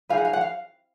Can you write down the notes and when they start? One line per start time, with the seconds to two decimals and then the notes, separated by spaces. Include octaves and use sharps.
0.09 D#4 G#4 B4 F5
0.17 F#5
0.25 F5
0.33 F#5
0.41 F5